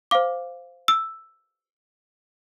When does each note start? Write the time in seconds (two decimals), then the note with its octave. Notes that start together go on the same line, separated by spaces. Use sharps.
0.11 C5 F5 D6
0.88 E6